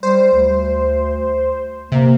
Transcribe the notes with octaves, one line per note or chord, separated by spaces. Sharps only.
G3 C5
D2
C3 A#3